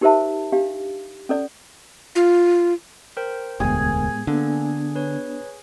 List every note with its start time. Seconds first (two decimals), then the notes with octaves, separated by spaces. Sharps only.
0.01 D#4 G4 A#4 C5 E5 A5
0.52 D4 G4 F5
1.29 C#4 A4 D5
2.15 F4
3.17 A#4 C5 G5
3.60 E1 D2 A2 G#3 B3 G#4 G#5
4.27 D3 A#3 B3 D4 A4
4.95 B4 C#5